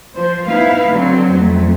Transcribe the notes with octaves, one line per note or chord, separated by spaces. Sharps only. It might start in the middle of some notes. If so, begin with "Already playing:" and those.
F3 C5
B3 D#4 E4 B4 F5
D3 F#3 C4
F2 A3